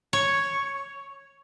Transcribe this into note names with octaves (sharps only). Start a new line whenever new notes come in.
C#5